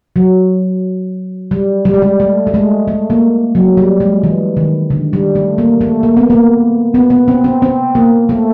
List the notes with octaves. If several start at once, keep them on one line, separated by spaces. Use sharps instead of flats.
F#3
G3
G3
G#3
G3
A3
A3
G#3
A3
A#3
F#3
G3
G#3
E3
D#3
D3
G3
A3
A#3
A3
A#3
B3
A#3
B3
B3
C4
C4
C4
A#3
A3